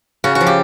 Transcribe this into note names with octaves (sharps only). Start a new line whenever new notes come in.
C#3 F#4
F#4
F3
G4